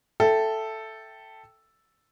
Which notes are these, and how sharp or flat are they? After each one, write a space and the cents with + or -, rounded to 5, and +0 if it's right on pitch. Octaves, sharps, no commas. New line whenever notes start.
A4 +0 E5 +0 G5 +0